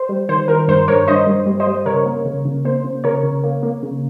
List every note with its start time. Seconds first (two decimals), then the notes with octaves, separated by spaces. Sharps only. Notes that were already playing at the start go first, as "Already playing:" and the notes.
Already playing: C5
0.09 G3
0.29 D#3 C5
0.48 D#3 A#4
0.68 G2 C5
0.88 G2 A#4 C#5
1.08 G2 C5 D#5
1.27 G2
1.46 G3
1.60 C5 D#5
1.67 G3
1.86 C#3 A#4 C#5
2.06 A#3
2.25 C#3
2.45 C#3
2.65 A#3 C5
2.84 C#3
3.04 C#3 A#4 C#5
3.23 C#3
3.43 A#3
3.63 A#3
3.83 C#3